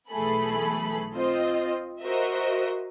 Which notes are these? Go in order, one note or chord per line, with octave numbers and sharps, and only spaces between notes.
B1 E3 A3 G#4 A4 B5
C4 F4 C5 D#5
F#4 A#4 C5 D#5 E5